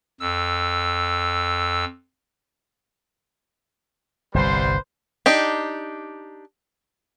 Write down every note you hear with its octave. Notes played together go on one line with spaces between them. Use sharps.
F2 E6
G1 C2 G3 B4 C5
D4 D#4 G4